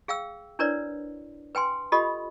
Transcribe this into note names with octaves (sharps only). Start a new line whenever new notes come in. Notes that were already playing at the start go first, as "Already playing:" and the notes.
G#4 F5 G5 E6
D4 E4 A#4 B4 C#5 D5
B4 G5 G#5 C6
F4 G4 A4 D#5 B5